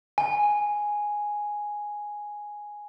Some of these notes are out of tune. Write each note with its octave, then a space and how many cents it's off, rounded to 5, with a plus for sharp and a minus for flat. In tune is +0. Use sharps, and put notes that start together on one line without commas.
G#5 +0